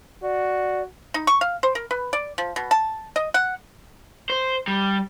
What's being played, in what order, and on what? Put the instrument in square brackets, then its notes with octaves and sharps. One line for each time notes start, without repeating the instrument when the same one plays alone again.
[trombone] F#4 [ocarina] D5
[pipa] D#4
C#6
F5
C5
A#4
B4
D5
F3
B2
A5
D#5
F#5
[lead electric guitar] C5
G3